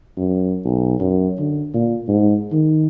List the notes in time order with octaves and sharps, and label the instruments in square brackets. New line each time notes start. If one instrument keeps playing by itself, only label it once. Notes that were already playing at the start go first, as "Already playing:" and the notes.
[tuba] F#2
B1
F#2
D3
A#2
G#2
D#3